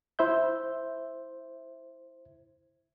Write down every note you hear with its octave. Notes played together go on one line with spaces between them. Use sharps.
E4 C5 E5 G6